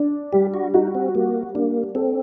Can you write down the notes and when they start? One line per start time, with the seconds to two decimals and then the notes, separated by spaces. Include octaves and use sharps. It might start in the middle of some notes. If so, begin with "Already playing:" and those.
Already playing: D4
0.33 G3 G4
0.54 F#4
0.74 D#4 F#4
0.95 C4
1.15 G3 A#3
1.54 A#3 D4
1.95 C4 A4